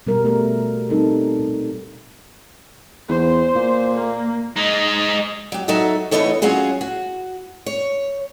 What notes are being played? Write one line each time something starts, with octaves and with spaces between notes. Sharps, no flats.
B2 G3 A#4
A3 A#4
G3 C4 D#4 A4 A#4
A#2
E2 C5
A#2
A#3
G#3 D#4
F#3 G4
F#3 D#4 F#4 A4 E5
E3 A3 B3 D#4 A4 C#5
F#3 C#4 F4 F#4 G#4
F#4
C#5